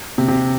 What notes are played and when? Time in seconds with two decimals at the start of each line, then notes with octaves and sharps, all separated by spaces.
0.18 C3
0.28 C3